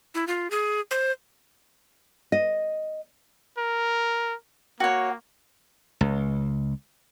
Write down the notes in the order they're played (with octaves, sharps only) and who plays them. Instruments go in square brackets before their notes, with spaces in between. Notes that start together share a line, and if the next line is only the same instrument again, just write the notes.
[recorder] E4
F4
G#4
C5
[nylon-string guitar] D#5
[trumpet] A#4
[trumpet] A#3 [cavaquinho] F#4 C#5
[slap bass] C#2